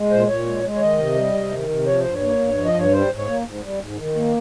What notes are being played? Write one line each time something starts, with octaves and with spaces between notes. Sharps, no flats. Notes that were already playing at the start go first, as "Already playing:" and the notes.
Already playing: G#3
A#2 C5
A#2 C#5
G#3
G#3
C#5
D#3 D#5
C3
G3
C3
D#3
C3
F3 C#5
G2 C5
C#5
A#3
G2
F3
D#5
G2 C#5
G3 C5
G#2
C#5
A#3
G#2
G3
G#2
D#3
A#3